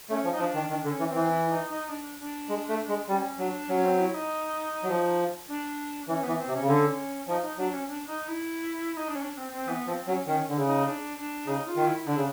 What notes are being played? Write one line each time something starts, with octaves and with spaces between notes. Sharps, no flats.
A3 C#4
F3
D#4
F3 D4
D#3
D#3 D4
D3
C#4
E3
C4
E3
E4
D#4
D#4
D4
D4
G#3
A3
G#3
G3 C#4
F#3 D4
F#3 C#4
C4
E4
D#4
F#3
F3
D4
E3 C#4
E3 B3
C4
C3
C#4
C#3
D3 C#4
F3 D#4
D#4
F#3 D4
C#4
D4
D#4
E4
D#4
D4
C#4
D4
C4
C4
E3 B3
F3 C4
F#3 C#4
D#3 C#4
D3
C#3
D#4
D4
D4
C#3 D#4
F4
D#3
E4
D3 D4
C#3